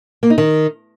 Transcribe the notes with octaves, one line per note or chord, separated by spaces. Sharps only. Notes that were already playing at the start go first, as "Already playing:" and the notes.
A#3
D#4
D#3